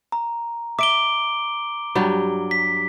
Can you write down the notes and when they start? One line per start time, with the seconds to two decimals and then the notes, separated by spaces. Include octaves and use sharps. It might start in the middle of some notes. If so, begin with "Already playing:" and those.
0.12 A#5
0.79 E5 D6 D7 G7
1.95 G2 F#3 G3
2.51 B6